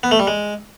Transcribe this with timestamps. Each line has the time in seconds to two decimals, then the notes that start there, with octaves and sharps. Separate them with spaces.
0.03 B3
0.11 A3
0.19 G3
0.27 G#3